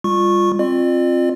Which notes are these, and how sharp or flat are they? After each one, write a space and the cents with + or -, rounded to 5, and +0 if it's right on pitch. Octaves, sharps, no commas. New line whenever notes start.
G3 +30 F4 +0 C#6 -15
C4 +15 F4 +0 D5 +45